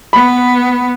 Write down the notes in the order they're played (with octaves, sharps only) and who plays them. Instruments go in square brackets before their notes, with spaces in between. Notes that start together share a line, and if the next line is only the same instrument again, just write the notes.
[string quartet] B3 [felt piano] B5